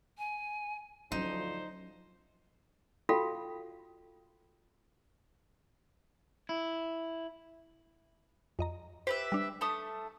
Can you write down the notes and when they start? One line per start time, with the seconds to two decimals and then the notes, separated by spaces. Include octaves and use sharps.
0.18 G#5
1.12 D2 F3 F#3 C#4 D#4 C5
3.09 F4 F#4 A4 F5 G5 B5
6.49 E4
8.59 F2 D#5 A#5
9.07 G4 B4 C5 E5
9.32 G3 D4
9.61 A3 A5 D#6